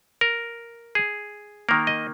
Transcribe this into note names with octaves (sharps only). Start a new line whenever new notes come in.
A#4
G#4
D#3 A#3 A#4
D#5